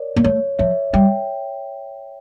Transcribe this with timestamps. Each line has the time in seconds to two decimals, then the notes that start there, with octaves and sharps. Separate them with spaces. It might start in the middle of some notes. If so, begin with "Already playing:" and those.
Already playing: A#4 C#5 D5
0.16 A#3
0.24 A3 C#5
0.59 F3 C#5 E5
0.93 G3 E5 G5